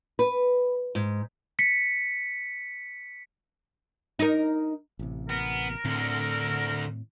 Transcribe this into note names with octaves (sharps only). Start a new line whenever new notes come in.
B4
G#2
B6 C#7
D#4 A#4
A1 C3
B3 A#4
D2 A2 D3 C4